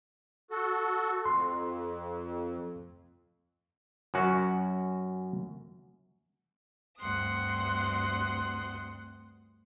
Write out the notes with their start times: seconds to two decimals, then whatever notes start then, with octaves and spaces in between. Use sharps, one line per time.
0.51 F#4 A4
1.25 F2 C6
4.14 F#2 C#4 F#4
6.98 D2 G2 C4 F#5 C6 D#6